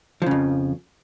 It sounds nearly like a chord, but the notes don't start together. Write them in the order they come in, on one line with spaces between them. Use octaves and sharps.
F3 C#3 F2